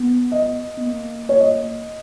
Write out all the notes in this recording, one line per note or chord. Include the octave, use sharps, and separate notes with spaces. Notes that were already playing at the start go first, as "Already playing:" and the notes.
Already playing: B3
D#5
B3
A#3
C#5
D#5